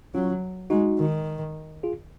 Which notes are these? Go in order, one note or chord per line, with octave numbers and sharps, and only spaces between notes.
F#3 C#4 F4
G#3 D#4 F#4
D#3
F4 G#4